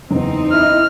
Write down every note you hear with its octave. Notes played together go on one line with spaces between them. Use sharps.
F#1 E2 C4 D#4
E4 D#5 F6